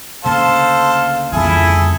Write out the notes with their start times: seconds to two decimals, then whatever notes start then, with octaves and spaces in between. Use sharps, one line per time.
0.24 D2 C#3 A#3 A4 C5 F5 A5
1.33 F2 G3 E4 G#4 A4